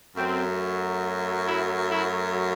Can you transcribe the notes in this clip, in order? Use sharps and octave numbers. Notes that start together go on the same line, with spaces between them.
F#2 F#3 A3 C4
E4
E4